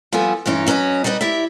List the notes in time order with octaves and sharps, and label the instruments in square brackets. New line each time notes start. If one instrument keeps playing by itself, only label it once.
[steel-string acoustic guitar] F3 G3 B3 A4 G#5
G2 E3 G#3 C#4 D#4
F#3 C#4 A#4 B4 D#5
G3 D#4 B4 D5 D#5
E4 G4 D5 E5